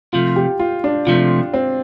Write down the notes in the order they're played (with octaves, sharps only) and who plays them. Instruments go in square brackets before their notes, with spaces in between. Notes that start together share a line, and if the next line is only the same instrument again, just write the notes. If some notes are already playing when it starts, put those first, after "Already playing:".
[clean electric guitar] C3 F3 A3 [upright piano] F4
[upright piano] G4
F4
D4
[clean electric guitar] C3 F3 A3 [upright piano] F4
[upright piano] C4